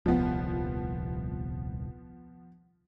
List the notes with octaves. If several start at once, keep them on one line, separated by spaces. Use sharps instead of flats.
D#1 C2 F3 B3